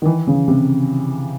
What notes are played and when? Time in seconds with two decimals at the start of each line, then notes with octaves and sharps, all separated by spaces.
0.02 D#3
0.05 E3
0.27 C#3
0.48 C3